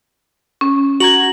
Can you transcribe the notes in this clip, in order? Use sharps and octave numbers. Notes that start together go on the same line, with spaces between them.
C#4
F#4 A#5 G#6 F#7